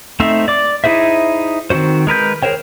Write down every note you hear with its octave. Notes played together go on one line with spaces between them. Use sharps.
A3 C4 D#4 C5 E5
D5 D6
D#4 E4 G#4 C5 E5
D#3 C4 D#4 F#4 C5
G#3 A#4 B4 G6
G#4 A#4 C5 C#5 G5